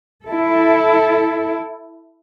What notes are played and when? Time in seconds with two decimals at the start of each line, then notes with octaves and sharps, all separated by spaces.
0.25 E4 A4